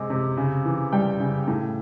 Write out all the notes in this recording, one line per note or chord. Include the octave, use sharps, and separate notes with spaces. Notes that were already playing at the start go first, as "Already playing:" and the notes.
Already playing: C3 G#3
C3
C#3
E3
G3 G5
C#3
A2